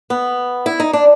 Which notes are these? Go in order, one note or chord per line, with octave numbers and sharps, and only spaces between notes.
B3
E4
D#4
D4